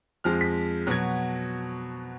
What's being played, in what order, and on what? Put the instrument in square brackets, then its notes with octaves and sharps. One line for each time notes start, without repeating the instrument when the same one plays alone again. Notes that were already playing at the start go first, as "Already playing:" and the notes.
[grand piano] F2 F3 G#3 F6
B6
B2 F#3 G#6